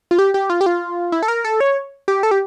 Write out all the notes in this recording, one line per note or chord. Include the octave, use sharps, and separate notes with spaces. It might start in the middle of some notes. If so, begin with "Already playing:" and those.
F4
G4
G4
F4
G4
F4
E4
A4
A#4
A4
C#5
G4
A4
G4